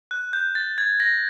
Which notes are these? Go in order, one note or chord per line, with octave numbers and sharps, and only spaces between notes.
F#6
G6
A6
G#6
A#6